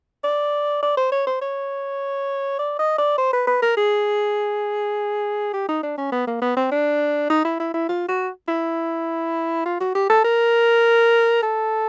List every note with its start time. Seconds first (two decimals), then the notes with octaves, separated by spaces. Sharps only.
0.24 D5
0.83 D5
0.98 C5
1.12 C#5
1.27 C5
1.42 C#5
2.59 D5
2.79 D#5
2.98 D5
3.18 C5
3.33 B4
3.47 B4
3.62 A#4
3.77 G#4
5.53 G4
5.69 D#4
5.83 D4
5.98 C#4
6.12 B3
6.27 A#3
6.42 B3
6.57 C4
6.71 D4
7.30 D#4
7.45 E4
7.60 E4
7.74 E4
7.89 F4
8.08 F#4
8.48 E4
9.66 F4
9.81 F#4
9.95 G4
10.10 A4
10.24 A#4
11.42 A4